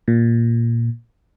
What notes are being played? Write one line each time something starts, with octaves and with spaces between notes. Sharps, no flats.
A#2